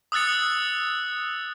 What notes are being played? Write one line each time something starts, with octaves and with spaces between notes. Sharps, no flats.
D#6 E6 F#6 A6 C#7